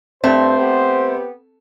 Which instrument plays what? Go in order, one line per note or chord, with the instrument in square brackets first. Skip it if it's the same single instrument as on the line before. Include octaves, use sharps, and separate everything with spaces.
[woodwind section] G2 [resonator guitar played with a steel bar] A3 [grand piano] C4 [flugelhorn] C5
[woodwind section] B3 G4